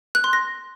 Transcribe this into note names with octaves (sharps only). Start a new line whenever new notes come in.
F#6
C6
A#6